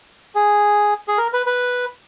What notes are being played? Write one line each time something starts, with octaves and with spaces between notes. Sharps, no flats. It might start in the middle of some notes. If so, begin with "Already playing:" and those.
G#4
G#4
A#4
B4
B4